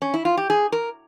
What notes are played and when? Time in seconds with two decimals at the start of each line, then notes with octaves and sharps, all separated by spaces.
0.02 C#4
0.14 E4
0.25 F4
0.37 G4
0.50 G#4
0.72 A#4